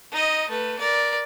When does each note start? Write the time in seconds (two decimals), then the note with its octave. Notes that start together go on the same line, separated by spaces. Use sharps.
0.12 D#4 D#5
0.49 A3 B4
0.79 A#4 D5